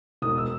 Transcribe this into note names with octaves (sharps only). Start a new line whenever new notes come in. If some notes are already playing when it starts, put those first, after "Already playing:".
E1 D#6
E6